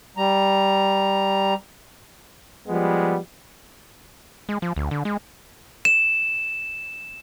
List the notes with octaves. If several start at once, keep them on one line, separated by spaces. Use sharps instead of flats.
G3 A#5
F3 G3 G#3 B3
G#3
F3
D2
D3
G#3
E7